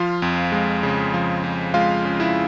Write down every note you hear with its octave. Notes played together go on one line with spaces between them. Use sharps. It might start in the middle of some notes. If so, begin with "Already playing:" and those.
Already playing: F3 F4 F5
F2
G#3
C#3
F3
F2
G#3 F4 F5
C#3
E4 E5